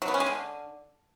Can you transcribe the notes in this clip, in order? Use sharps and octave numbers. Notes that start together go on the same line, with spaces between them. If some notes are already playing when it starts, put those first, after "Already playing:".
F#3
B3
C#4
G#3
D3